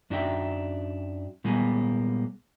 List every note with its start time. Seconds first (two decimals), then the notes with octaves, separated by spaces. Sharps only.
0.10 F#2 D4 D#4 F#4 E5 G5
1.44 A#2 G3 G#3 A#3 B3 G#5